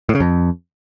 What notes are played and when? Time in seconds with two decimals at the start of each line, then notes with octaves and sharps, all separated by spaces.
0.09 A2
0.15 C#3
0.20 F2